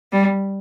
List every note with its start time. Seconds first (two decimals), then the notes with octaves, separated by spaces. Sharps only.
0.12 G3